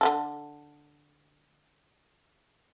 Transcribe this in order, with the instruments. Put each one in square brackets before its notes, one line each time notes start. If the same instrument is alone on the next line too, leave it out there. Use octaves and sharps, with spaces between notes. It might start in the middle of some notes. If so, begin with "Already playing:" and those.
[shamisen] D3 G#3 A4